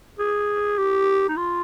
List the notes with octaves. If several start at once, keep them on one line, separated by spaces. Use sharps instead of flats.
G#4
G4
D#4
F4